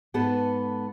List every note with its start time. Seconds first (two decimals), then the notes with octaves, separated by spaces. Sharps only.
0.14 G#2 B3 A4 B4 A5